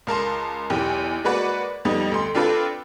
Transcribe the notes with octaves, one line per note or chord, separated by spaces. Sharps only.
C#2 A#4 A5 C6
B1 E2 G4
G#3 A#3 F#4 B4 D5 F#5
F2 G3 B3 D#4
D2 C6
C4 D4 F4 A4 B4 G5